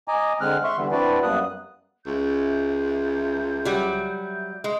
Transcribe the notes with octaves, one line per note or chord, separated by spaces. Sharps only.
D#5 G#5 A#5 D6
D3 G#3 C4 F6 F#6
E5 C6 C#6
D3 E3 G3 B3
C4 D4 E4 F#4 B4 D5
F#2 G3 A#3 B3 D#6 F#6
C#2 E5 G6
F#3 G3
G#3 C6